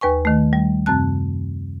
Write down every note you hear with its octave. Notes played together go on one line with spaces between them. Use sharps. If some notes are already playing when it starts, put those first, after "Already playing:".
D#2 B4 G#5 C#6
D#3 A3
G3
F#2 C3 C4 A5 F#6